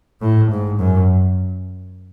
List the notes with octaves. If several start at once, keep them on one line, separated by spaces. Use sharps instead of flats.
A2
G#2
F#2